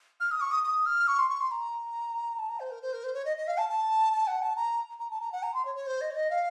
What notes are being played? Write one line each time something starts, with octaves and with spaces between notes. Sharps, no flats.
F6
D#6
C#6
D#6
D#6
F6
C#6
C6
C#6
C6
A#5
A5
A#5
C5
A#4
C5
A#4
C5
C#5
D#5
D#5
F5
A5
A5
A5
F#5
A5
A#5
A#5
A5
A#5
F#5
A#5
C6
C#5
C#5
C5
D#5
C#5
D#5
F5